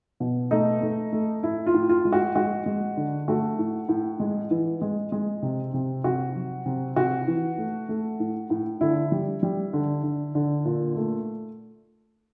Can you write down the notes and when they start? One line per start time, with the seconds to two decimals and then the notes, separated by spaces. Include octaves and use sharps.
0.20 B2
0.51 A3 D#4
0.82 A3
1.13 A3
1.43 A2 E4
1.66 F4
1.74 A2
1.89 F4
2.05 G#3
2.12 F#4
2.35 G#3 F#4
2.66 G#3
2.97 D3
3.28 A3 F#4
3.59 A2
3.89 A2
4.20 G#3
4.51 E3
4.82 G#3
5.12 G#3
5.42 C3
5.74 C3
6.04 C3 F#4
6.35 F#3
6.66 C3
6.96 C3 F#4
7.27 E3
7.58 A3
7.89 A3
8.20 A2
8.50 A2
8.81 D3 E4
9.12 G3
9.43 G3
9.73 D3
10.03 D3
10.35 D3
10.65 A#2
10.96 A3